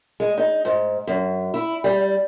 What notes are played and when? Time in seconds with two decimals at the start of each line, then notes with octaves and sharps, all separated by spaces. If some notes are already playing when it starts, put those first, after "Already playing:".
0.20 G#3
0.38 D#4
0.65 G#2
1.07 F#2
1.54 E4
1.84 G3